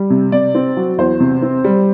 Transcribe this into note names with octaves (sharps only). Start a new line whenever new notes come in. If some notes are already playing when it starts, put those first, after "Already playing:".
Already playing: G3
C3
C3 D5
C4
F#3
E2 C5
C3
C4
G3